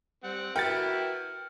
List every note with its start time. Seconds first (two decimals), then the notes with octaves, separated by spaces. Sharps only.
0.24 G3 C4 F#5
0.56 E4 F#4 A#4 B4 G5 F6 A6 C#7